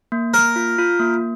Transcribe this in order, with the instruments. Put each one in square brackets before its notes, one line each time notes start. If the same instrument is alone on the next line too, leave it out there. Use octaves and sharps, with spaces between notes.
[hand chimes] A#3
[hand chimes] A#3 [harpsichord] A#4
[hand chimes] F4
F4
A#3